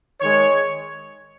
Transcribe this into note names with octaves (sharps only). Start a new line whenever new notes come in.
D#3 G#3 C#5